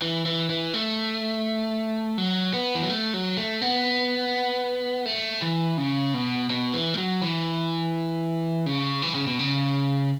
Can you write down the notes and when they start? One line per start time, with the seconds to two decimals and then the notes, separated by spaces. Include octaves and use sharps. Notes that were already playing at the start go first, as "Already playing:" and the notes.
0.02 E3
0.26 E3
0.50 E3
0.74 A3
2.18 F#3
2.54 B3
2.75 E3
2.82 F#3
2.90 A3
3.14 F#3
3.37 A3
3.62 B3
5.05 A3
5.42 E3
5.78 C#3
6.14 B2
6.50 B2
6.73 E3
6.94 A3
6.98 F#3
7.22 E3
8.66 C#3
9.02 E3
9.15 C#3
9.27 B2
9.39 C#3